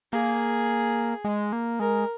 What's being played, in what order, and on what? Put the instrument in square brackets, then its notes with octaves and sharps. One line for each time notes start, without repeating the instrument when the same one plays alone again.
[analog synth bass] A#3 [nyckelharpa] G#4
[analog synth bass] G#3
A#3
[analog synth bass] G#3 [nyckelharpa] A#4